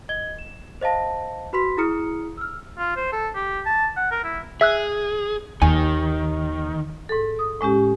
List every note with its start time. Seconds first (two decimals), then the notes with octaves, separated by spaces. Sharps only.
0.09 D#5 G#6 G7
0.39 E7
0.81 C5 D#5 F5 A5 A#6
1.53 F#4 B4 B5 C6 B6
1.77 E4 G#4 A#5 D#6 F6 C#7
2.37 E6 F6
2.78 F4
2.96 C5
3.12 A4
3.35 G4
3.66 A5
3.96 F#5
4.11 A#4
4.24 E4
4.61 G#4 E5 E6 F#6
5.62 D#2 D#3 G#5
7.09 G#2 A4
7.39 D#6
7.61 A2 G#3 C#4 G4